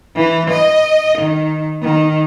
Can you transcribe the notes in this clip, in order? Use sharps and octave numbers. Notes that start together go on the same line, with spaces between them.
E3
D#5
D#3
D#3